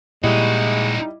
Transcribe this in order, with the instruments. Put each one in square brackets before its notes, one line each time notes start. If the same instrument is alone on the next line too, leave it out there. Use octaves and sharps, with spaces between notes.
[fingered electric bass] A#2 [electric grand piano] G3 E4 D#5 [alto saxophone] G#3 [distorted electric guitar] D#4 F#4